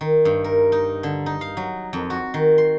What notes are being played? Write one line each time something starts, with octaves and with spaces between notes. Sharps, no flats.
D#3
G2
A#4
D#4
D3
D#4
F5
F#3
F2
F#4
D#3
C6